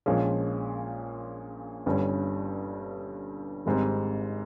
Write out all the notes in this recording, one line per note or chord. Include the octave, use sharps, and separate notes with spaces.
A#1 A#2 F3 G#3 C#4
G1 G2 G3 C#4
G#1 G#2 G3 C4